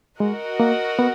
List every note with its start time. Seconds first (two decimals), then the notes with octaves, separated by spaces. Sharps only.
0.20 G#3 F#4 A#4 D#5 F#5
0.60 A#3
0.99 B3